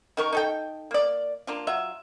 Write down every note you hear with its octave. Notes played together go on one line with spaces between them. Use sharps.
D#3 A#4 C#6
D#4 A4 G5
A#3 D5
A#3 D4 F4
F#3 F4 E5